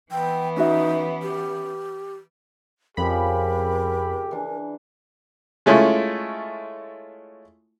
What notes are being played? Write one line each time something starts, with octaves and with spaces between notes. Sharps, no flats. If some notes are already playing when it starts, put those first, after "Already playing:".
E3 B3 G5
C#4 D#4 F#4 E5
G4
F2 C#3 F3 G4 A#4 B5
E3 D4
G#3 A3 C#4 E4 F4